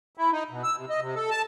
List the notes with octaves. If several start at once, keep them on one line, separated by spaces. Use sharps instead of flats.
E4
D#4
B2
E6
C3
D#5
C3
A4
A5